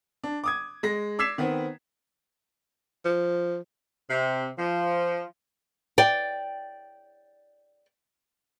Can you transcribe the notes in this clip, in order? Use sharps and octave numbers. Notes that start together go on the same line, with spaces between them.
D4
D6 D#6 G#6
G#3 A#6
D6 E6 G#6 B6 C7 E7
D#3 B3 C4
F3
C3
F3
D5 G5